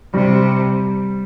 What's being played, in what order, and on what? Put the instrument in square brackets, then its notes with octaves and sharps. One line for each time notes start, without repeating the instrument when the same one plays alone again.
[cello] C3 [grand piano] G3